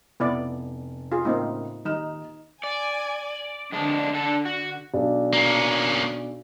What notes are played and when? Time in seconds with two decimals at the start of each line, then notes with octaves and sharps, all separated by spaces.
0.20 F1 B3 E4 D5
1.12 F4 G#4
1.25 A2 C#3 A#3 C4 D#4
1.85 D#2 D#4 F6 E7
2.64 D5 G#5
3.72 F2 D3 G#3 D4
4.14 D4 A4
4.45 F#4
4.94 B1 D4
5.33 A#3 C#4